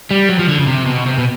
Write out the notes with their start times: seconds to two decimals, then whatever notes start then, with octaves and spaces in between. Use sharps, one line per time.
0.11 G3
0.29 F#3
0.39 F3
0.49 D3
0.59 C#3
0.67 C3
0.86 B2
1.06 C3
1.19 B2